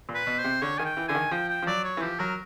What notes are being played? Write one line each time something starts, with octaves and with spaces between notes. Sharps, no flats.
A#2
B4
B2
C5
C3
D3 C#5
D#3 G#5
G5
E3
D3 G#5
D#3
F3 G5
G5
F3
F#3 D5
C#5
E3
F3 G4
F#3 A#4